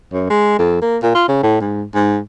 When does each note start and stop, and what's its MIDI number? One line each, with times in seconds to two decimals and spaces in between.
0.13 0.29 42
0.30 0.54 56
0.59 0.78 41
0.82 0.97 58
1.03 1.12 46
1.15 1.24 65
1.28 1.39 49
1.43 1.60 45
1.61 1.84 44
1.95 2.19 44